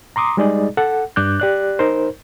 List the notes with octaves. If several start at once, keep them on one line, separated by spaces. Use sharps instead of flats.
A#5 C6 D6 D#6
G3 G#3 D#4 G#4 D5 D#5
A4 F#5
G2 D4 D6 F#6 G6
G4 D5 F#6
D#4 A#4 C5